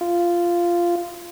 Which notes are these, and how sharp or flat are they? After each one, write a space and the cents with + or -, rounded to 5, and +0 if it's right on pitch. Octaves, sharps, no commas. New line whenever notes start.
F4 -10